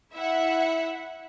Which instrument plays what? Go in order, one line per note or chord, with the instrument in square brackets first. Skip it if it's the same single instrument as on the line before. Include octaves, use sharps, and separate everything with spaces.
[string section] E4 E5 F#5